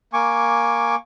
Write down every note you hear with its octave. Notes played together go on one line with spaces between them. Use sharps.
A#3 G#5 C#6 D6